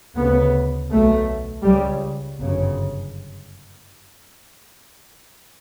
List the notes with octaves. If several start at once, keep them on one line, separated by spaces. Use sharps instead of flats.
D2 C#3 B3
B1 B2 A3
C#2 C#3 G3
G1 F#2 C#3